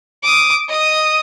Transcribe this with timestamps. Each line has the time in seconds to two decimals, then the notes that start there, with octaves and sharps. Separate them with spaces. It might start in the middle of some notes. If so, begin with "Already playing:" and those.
0.23 D6 D#6
0.68 D#5 D#6